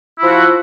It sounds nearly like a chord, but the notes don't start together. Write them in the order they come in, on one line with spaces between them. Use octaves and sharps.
E4 F3 F#4